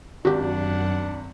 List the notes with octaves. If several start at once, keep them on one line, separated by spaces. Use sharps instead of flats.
G#1 F#2 D4 F#4 G4 F#5